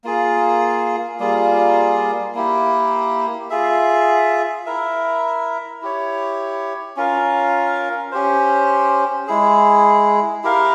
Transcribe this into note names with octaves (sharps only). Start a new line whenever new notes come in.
A#3 F4 G#4
G3 A#3 F4 G#4
A#3 E4 G4
F4 G#4 E5
E4 A#4 E5
E4 G4 C#5
C#4 F4 A#4 F5
C#4 G4 C5
G#3 E4 G#4
E4 G4 A#4 F5